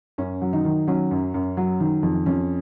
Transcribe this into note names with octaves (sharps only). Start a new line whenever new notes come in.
F#2 C#4
F#3
D#3 D#4
D#3
F#3 C#4
F#2
F#2
F#3
D#3
F2
F2 C#4